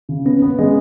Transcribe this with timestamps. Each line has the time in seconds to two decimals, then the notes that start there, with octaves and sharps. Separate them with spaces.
0.09 C#3
0.25 B3 C#4
0.42 B3
0.59 G#3 C#4